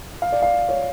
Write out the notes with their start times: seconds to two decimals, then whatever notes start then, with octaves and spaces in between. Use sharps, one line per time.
0.22 F5
0.32 D5
0.42 F5
0.69 C#5